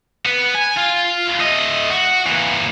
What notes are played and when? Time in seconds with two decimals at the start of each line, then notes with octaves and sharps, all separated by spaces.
0.25 B3 B4
0.55 G#5
0.77 F4
1.40 A3 D#5
1.90 F#4
2.27 E3 A#3